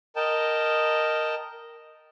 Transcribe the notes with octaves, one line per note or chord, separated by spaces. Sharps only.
A#4 D#5 G5 A5